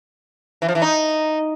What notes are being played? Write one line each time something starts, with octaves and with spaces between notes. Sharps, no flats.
E3
F3
E3
D#4